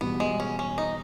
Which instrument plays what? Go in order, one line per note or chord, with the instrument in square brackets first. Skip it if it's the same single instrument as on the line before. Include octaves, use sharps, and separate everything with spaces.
[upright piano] E2 B2 G3 [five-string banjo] B3
[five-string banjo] G#3
C#4
C#4
D#4